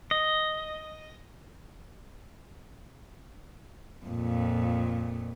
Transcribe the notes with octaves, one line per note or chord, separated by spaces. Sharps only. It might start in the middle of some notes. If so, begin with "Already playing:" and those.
D#5
F2 A#2